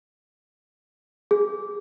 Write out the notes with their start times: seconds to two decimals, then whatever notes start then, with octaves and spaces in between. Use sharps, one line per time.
1.31 G#4